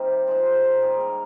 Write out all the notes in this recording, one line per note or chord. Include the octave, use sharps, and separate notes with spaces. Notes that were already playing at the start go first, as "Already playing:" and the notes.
Already playing: C3 D#3 G3 A#3 D#4 A#4
F3 G#3 D#4 D5
C5
A#4
D#3 G3 A#3 G#4
A#4